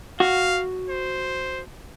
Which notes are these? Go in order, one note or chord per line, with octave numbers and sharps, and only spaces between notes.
F#4 F5
C5